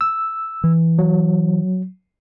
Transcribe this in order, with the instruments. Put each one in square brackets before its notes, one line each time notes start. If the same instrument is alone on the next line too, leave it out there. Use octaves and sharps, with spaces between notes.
[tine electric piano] E6
[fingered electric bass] E3
[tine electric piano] F#3